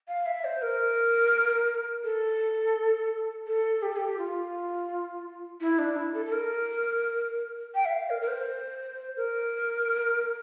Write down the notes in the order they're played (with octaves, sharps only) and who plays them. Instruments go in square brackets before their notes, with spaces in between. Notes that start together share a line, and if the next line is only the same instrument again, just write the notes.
[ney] F5
E5
C5
A#4
A4
A4
G4
A4
G4
F4
E4
D4
E4
A4
A4
A#4
G5
E5
F5
A#4
A#4
C5
A#4